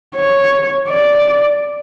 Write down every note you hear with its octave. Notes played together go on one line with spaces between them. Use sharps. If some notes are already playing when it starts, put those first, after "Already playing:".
C#5
D5